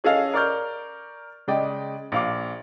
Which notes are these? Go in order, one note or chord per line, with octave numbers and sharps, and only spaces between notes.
C#4 G#4 A4 D#5 F5
A#4 D5 C#6 F6 G6
C#3 G#3 D5 D#5 G5
A#1 F5 D6